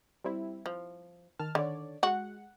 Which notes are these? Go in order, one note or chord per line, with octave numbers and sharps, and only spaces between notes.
G3 C4 E4
F3
D#3 A5 F6
D3 D#3 C#5 D5
G#3 F#4 F#5